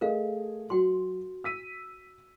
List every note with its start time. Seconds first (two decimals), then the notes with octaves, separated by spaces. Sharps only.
0.01 A3 G#4 A#4 D#5 F5
0.70 F#3 F#4 G5 C6
1.44 E6 B6 D#7